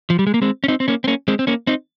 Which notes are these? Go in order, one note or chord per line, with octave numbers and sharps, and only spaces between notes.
F3
G3
G#3
A#3
G#3 C4
C#4
C4 D#4
C4
A#3 C#4
C4
A#3 C#4
G#3 C4
C4
A#3 C#4
C4 D#4